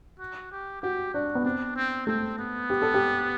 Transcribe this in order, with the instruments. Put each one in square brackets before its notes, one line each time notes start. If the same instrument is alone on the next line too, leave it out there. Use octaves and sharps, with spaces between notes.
[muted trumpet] F#4
G4
[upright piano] F#4 [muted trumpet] G4
[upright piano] D4 [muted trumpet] F#4
[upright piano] B3
[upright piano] C4 [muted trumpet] D4
[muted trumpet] C4
[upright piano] A3 [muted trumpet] C4
[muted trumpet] B3
[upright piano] G4
A4
G4